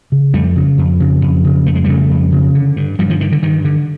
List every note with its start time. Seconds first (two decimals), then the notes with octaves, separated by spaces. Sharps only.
0.12 C#3
0.34 F2 G3 A3
0.56 C#3
0.78 F2
1.00 C#3
1.22 F2
1.44 C#3
1.66 F2 A3
1.75 G#3
1.84 C#3 G3 A3
2.10 F2
2.32 C#3
2.55 D3
2.76 G2
2.99 G2 F3 G3
3.10 D#3 F3
3.21 D3 D#3
3.32 D3
3.43 G2 D#3
3.65 D3